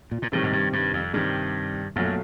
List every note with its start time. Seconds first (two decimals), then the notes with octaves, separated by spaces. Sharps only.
0.12 A#2
0.22 A#2
0.32 A2 C3 D#3 G3
0.43 G#2
0.53 G2
0.73 G2
0.93 F2
1.13 G2 C3 D#3 G3
1.96 B1 F#2 A#2 F#3 A3